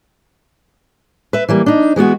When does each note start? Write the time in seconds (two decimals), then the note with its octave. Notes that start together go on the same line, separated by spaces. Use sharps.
1.33 B4 E5
1.49 E3 G3 A#3
1.66 D4 D#4
1.96 E3 G#3 B3 F#4